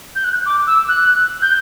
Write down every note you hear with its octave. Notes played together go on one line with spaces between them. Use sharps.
G6
F#6
D6
E6
F#6
G6